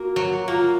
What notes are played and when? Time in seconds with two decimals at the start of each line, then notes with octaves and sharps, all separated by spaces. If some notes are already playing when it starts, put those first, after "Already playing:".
Already playing: A#3 F#4
0.16 F#3
0.48 A#3 F4